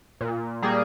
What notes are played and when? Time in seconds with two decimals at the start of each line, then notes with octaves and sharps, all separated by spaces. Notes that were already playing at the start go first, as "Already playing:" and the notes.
0.21 A#2
0.62 G3 A#3 G#4